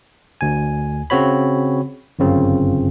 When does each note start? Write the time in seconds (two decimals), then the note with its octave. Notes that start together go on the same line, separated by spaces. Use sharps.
0.41 D2 G#5
1.10 C#3 C4 F#4 C#5 B5
2.19 G1 F#2 C#3 C4 F4